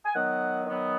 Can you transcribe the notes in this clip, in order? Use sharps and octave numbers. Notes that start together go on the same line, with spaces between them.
G#5
D#3 F#3 B3 F#5
D#3 F#3 B3